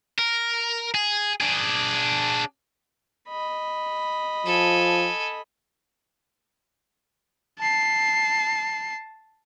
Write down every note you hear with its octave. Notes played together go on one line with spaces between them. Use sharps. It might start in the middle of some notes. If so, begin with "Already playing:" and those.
A#4
G#4
D4 G#4
D#5 B5
F3 A4 G#5
A5 C7